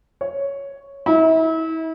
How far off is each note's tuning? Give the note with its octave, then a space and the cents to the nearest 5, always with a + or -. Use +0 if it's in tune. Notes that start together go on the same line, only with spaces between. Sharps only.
C#5 +0
E4 -35